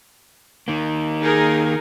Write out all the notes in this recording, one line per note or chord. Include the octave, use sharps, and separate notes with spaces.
D#3 A#3
D#4 G#4 A#4